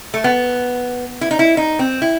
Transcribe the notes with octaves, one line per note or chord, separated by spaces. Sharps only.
A3
B3
E4
D#4
E4
D#4
C4
E4